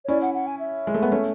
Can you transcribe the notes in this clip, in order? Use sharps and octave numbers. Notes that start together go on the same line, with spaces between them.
C#5
C#4 E4 D5
F#5
F#5
G#5
E5
G#3
A3
B3
A3 C#4